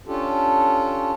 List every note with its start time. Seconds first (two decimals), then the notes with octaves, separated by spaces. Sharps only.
0.07 C#4 D4 F4 G4 A4